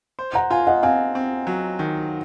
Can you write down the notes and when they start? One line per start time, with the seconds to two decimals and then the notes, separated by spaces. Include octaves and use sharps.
0.19 C5
0.35 F#5 A#5
0.50 F4 F5 G#5
0.67 D#5 F#5
0.83 C4 F5 G#5
1.15 C4
1.47 F#3
1.79 D#3